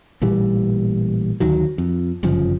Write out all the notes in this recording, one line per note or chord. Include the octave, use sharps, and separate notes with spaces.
A1 A#2 E3 G3
D2 D#3 F#3
F2
G1 F#2 C#3 F3